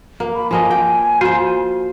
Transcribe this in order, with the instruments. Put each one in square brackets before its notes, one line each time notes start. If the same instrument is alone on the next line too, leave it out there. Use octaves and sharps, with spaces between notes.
[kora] A#3
[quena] B5
[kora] F3 A#3 D#5 [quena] G#5
[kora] G5
[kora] F4 C5 [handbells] F#4